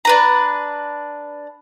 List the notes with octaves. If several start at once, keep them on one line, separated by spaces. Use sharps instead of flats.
D4 B4 A#5